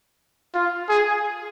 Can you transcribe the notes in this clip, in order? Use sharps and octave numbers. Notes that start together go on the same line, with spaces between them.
F4
G#4